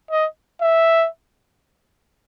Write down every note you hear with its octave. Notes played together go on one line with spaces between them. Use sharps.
D#5
E5